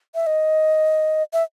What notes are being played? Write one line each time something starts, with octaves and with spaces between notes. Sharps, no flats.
E5
D#5
E5